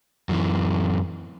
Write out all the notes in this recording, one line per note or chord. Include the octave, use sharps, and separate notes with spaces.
F#2 E3